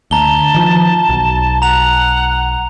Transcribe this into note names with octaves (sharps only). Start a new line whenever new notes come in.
D2 A5 A#5 G7
D#3 F3
B1
F#5 A#5 F7